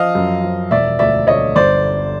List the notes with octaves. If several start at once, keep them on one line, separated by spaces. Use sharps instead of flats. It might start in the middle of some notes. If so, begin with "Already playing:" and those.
Already playing: F3 D#5 F5
F#2
F3
E1 D5 E5
D2 D5 E5
D3 C#5 D#5
G1 C5 D5